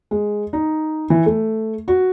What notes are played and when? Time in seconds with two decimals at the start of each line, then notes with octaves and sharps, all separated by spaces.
0.11 G#3
0.53 D#4
1.10 E3
1.26 A3
1.88 F#4